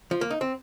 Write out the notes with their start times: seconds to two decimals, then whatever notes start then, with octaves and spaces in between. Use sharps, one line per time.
0.11 F3
0.21 A#3
0.30 D#4
0.41 C4